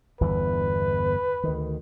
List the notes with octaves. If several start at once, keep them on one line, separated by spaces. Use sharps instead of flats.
G1 E2 E3 B4
D2 D#3